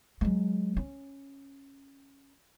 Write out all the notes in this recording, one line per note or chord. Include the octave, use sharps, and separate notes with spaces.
F#3 G#3
C#4